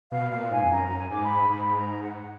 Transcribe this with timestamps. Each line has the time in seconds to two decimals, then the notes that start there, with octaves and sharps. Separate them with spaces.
0.12 B2 F5
0.31 A#2 F5
0.43 F#5
0.51 G#2 G#5
0.64 F2
0.70 F#2 A#5
0.97 G#5
1.10 G#2 D6
1.23 B5
1.50 G#2 B5
1.76 A#5
2.02 F#5